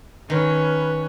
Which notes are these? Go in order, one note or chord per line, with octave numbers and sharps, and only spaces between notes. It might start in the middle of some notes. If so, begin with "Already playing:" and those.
D#3 C#4 B4